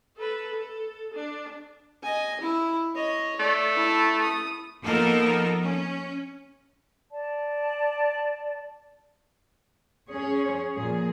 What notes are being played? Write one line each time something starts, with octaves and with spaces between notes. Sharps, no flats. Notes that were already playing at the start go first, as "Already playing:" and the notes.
A4 B4
A4
D4
D#5 G#5
E4
C#5 D#5
A3 D5
E4 A5
D#6
F3 A#3 B3 D#4 A4 A#4
C#4
D5 A5
C#4 G#4 C#5
A#2 F3 G#4